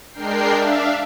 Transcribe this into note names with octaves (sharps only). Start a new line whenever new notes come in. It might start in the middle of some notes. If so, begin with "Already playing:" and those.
G#3 D4 A#4 G5 C7
D4 E5 F5